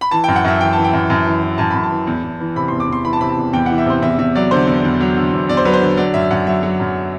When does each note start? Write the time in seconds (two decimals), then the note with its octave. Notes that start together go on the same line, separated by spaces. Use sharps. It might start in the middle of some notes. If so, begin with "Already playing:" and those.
0.01 B5
0.11 E3 A5
0.24 G5
0.28 F#2
0.36 F#5
0.45 F#2 E5
0.60 E3 G5
0.73 E3 A5
0.84 G5
0.93 F#2
1.10 F#2
1.26 E3
1.42 E3
1.58 F#2 A5
1.70 F#2 B5
1.83 A5
1.91 E3
2.07 E2
2.23 E2
2.40 E3
2.56 C3 B5
2.68 E2 C6
2.80 D6
2.88 E2 C6
3.04 E3 B5
3.13 A5
3.21 C3 B5
3.29 A5
3.37 E2
3.53 E2 G5
3.66 E3 F#5
3.78 E5
3.86 C3 C5
4.02 E2 E5
4.18 E2 E5
4.35 F#3 D5
4.51 D3 C5
4.67 E2
4.84 E2
5.00 F#3
5.16 D3
5.32 E2
5.49 E2 D5
5.57 C5
5.65 F#3 B4
5.73 C5
5.81 D3
5.97 F#3 D5
6.14 F#2 E5
6.31 F#2 F#5
6.47 F#3 E5
6.63 F#3
6.80 F#2